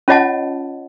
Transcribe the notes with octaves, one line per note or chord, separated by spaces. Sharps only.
C#4 F4 C#5 D#5 F#5 A5